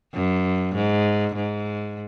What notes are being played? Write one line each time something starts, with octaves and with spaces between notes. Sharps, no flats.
F#2
G#2
G#2